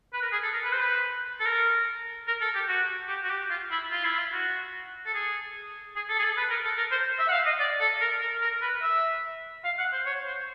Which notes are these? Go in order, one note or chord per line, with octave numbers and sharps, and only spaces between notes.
B4
A#4
G#4
A4
A#4
B4
C5
B4
A4
A#4
A#4
A4
G4
F#4
G4
F#4
G4
F4
E4
F4
E4
F4
F#4
A4
G#4
G#4
A4
G#4
A4
B4
A#4
A4
A#4
C5
E5
F#5
F5
D#5
D5
A4
A#4
A#4
A#4
B4
E5
F5
F#5
C5
C#5
C5